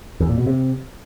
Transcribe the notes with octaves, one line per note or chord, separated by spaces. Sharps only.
E2
A#2
B2
C3